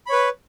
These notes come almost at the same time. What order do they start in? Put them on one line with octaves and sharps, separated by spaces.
B5 C#5 B4